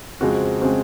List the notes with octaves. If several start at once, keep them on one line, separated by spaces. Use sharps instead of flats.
F2 C#3 G#3 C4 F#4
C#3 G#3 C4 F#4